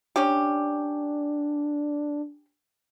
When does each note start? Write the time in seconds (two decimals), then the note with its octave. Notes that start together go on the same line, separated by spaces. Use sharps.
0.16 C#4 D4 G4